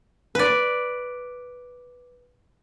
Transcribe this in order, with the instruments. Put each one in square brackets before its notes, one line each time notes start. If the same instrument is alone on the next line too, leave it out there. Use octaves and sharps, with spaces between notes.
[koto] B4 D5